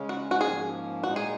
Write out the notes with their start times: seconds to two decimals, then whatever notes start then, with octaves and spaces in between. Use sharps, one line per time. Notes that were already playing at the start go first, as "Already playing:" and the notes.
Already playing: C#3 G#3 C#4
0.09 F#4
0.31 F#4
0.41 G#2 F3 A#3 C#4 G#4
1.04 A#2 G#3 D#4 F#4
1.16 G#4